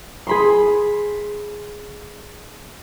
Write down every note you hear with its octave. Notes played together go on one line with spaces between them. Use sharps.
G#4 B5 C6